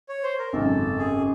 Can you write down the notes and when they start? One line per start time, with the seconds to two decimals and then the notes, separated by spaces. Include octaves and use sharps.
0.09 C#5
0.23 C5
0.39 A#4
0.53 G#1 F#2 C#3 A4
0.99 G#4